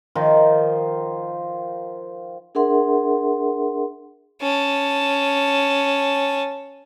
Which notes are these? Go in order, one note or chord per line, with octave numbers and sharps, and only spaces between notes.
D#3 F3
D4 G#4 A#4 E5 F#5 C6
C#4 A5